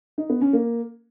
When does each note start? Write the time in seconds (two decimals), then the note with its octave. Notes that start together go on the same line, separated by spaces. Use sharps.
0.18 D#4
0.30 B3
0.41 C#4
0.53 A#3